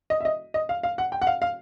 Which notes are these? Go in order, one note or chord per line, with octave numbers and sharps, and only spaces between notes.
D#5
E5
D#5
D#5
F5
F5
F#5
G5
F#5
F5
F5